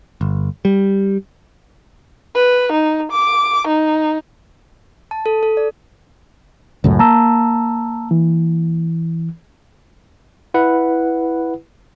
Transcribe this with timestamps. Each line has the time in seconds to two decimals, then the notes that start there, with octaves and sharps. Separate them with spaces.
0.21 G1
0.65 G3
2.35 B4
2.72 D#4
3.12 D6
3.68 D#4
5.11 A5
5.26 A4
5.43 A4
5.57 D5
6.84 C#2 F#2 A2
6.99 A#3 A5 A#5 E6
8.11 E3
10.54 E4 B4 F#5